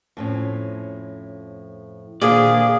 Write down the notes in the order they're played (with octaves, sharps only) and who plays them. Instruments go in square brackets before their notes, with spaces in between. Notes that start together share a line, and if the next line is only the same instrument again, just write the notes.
[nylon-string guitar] F2 A2 C#4
[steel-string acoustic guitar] A#2 [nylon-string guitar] D3 D#3 C5 [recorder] G#4 [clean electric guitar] D5